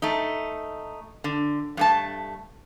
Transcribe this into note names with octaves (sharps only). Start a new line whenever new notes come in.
A3 D#4
D3
G2 A3 A5